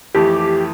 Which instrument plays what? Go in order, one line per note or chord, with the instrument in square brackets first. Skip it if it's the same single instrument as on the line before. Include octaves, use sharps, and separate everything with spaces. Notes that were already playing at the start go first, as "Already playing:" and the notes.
[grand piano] F2 E3 A3 [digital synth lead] G4